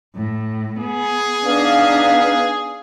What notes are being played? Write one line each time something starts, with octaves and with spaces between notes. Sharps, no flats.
A2
B3 G#4
B3 D4 D#4 F5